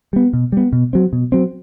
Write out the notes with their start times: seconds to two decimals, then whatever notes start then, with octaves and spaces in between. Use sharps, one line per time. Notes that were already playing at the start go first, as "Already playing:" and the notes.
0.13 G3 B3
0.33 B2
0.52 G3 B3
0.73 B2
0.93 F#3 C4
1.13 B2
1.32 F#3 C4